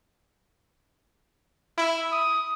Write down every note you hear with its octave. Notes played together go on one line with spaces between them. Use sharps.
E4
D#6